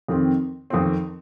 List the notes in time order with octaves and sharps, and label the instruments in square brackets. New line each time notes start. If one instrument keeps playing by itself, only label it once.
[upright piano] F2 D#3 C4
F2 D#3 C4